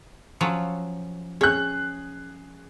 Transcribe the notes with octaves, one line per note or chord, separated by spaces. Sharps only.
F3 F#3 C#4
C#4 G#4 F#6